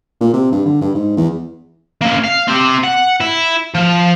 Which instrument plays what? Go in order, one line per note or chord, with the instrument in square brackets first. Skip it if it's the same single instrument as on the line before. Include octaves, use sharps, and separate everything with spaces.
[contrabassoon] A#2
C3
G2
D3
G2
G#2
E2
[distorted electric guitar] A#3 C#4
F5
C4 G4
F#5
E4
F3